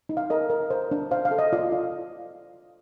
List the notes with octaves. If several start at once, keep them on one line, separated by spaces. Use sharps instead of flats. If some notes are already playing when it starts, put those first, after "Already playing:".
D#4
F5
A#4 D#5
A#4
C5
D4
C5 F5
F5
A4
D#5
F4 D5
F4